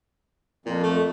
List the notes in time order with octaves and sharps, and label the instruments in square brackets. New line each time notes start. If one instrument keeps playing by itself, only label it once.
[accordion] F2 [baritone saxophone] A#2
[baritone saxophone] A3